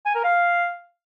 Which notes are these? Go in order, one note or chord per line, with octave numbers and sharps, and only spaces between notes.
G#5
A#4
F5